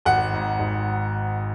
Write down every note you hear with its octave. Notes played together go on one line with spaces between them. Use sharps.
G#1 F#5
G#2
G#1